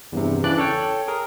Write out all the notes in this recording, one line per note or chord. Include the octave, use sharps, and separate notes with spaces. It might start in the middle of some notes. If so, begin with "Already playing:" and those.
E2 G2 C3
C#3 E3 D4 D5 F#6
A4 C#5 G5
G#4 A#4